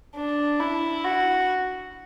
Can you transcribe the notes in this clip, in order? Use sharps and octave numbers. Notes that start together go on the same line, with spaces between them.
D4
E4
F#4